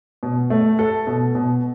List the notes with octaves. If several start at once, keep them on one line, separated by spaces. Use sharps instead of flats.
B2
A3
A4
B2
B2